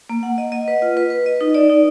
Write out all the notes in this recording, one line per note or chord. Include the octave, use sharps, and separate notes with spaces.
A#3
F#5
D#5
D#5
B4
F4
B4
B4
D#5
D#4
D5
D#4